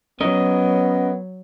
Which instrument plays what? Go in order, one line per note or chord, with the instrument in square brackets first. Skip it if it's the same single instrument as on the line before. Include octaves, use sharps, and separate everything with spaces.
[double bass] F#3 [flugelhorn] B3 [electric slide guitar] C#4 A#4 D#5